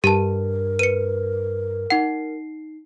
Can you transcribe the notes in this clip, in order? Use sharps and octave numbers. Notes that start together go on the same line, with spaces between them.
G2 G4 A#4 A5
B4 C#7 D#7
D#4 F#5 C7